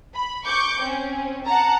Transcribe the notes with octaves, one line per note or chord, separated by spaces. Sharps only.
B5
C#6 D6 G6
C4 C#4
F#5 A5 A#5